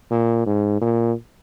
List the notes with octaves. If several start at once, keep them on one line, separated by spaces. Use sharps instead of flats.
A#2
G#2
A#2